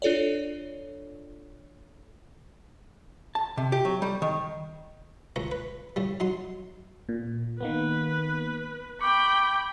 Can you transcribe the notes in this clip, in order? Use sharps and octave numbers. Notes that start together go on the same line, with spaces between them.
D4 F4 A4 C#5 D5
A5
C3
G4
F#3
G3
D#3
C#2 C#3 C#4 A#5
B4
A2 C#3 G3
F#3 D#4 C6
A#2
D#3 A#3 B3 B4
G5 B5 C#6 D6